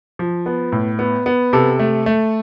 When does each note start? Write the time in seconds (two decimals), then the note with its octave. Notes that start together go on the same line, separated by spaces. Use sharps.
0.19 F3
0.46 B3
0.72 A2
0.99 B3
1.26 B3
1.53 C3 A4
1.79 A3
2.06 A3